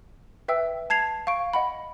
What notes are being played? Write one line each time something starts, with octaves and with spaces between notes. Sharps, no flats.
B4 E5 G5 E6
A5 G#6 C7 F7
F5 C#6 D7
D#5 F#5 B5